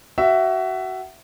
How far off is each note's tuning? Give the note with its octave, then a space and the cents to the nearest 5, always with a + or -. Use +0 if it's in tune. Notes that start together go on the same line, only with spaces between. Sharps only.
F#4 +25 E5 +10